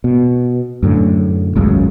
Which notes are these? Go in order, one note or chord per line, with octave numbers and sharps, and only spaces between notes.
B2
F#2 A2 D3
G#1 C#2 F#2 C#3